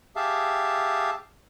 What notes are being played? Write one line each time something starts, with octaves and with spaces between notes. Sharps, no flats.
G4 G#4 E5 F5 A5